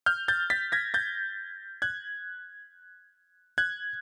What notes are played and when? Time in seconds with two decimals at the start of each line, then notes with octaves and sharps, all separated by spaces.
0.06 F6 G6
0.28 G6 A6
0.50 A6 B6
0.72 G#6 A#6
0.94 G6 A6
1.82 F#6 G#6
3.58 F#6 G#6